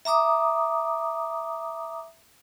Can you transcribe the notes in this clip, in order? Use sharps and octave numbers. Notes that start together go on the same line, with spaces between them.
E5 A#5 D6 D#6